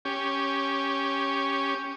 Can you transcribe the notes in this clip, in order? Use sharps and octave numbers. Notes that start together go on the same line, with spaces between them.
C#4 G4